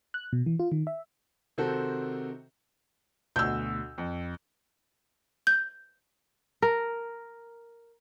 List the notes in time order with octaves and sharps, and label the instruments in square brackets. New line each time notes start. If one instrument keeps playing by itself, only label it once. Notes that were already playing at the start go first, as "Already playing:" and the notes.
[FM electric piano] F#6
B2
E3
F4
D#3
E5
[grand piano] C3 D#3 C4 F#4 A4 C5
[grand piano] D2 B2 [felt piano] E6 G6
[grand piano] F2
[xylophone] G6
[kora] A#4